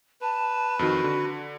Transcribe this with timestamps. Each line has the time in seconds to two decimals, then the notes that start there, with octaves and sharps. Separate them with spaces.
0.21 B4 A5
0.79 F2 D#3 F#4
1.04 D3